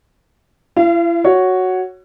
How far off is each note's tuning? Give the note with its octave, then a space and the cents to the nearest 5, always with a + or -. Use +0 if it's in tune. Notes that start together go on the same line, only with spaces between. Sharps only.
E4 +40 F5 -35
F#4 +0 C#5 +0